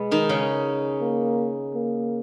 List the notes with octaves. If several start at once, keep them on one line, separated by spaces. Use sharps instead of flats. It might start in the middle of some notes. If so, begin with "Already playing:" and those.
Already playing: B2 G#3 B3
D#3 D#4
C#3 C#4
A#3
A#3